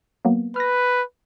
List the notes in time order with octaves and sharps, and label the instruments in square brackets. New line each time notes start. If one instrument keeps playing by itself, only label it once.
[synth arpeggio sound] F#3 A#3 B3
[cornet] B4 [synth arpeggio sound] F6 A#6